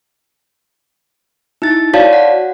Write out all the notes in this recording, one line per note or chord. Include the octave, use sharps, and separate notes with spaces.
D#4 E4 A6
F#4 C#5 D5 F5 A5
F#5